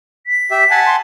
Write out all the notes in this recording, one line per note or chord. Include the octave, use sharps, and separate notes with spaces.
B6
G4 E5
F#5 G#5 A5
C6